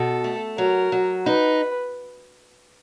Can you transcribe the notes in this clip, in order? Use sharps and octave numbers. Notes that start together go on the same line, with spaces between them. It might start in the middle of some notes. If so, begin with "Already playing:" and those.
Already playing: B2 A4
A3
F#3 A#4
F#3
D#4 B4